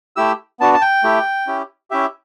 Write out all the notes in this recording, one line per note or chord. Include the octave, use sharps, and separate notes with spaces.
A3 E4 G4 E6
B3 D4 F#4 A5
A5
G5
A3 E4 G4
C#4 E4 G4
C#4 E4 G4 E5